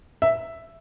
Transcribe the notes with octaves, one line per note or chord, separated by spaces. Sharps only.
E5